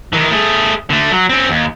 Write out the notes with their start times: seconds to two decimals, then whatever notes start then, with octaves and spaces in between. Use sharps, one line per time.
0.13 D#3 E3
0.30 A3 G#4
0.90 D3 A3
1.11 F#3
1.29 C4 C#4
1.49 D#2